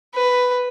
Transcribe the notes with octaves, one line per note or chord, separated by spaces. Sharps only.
B4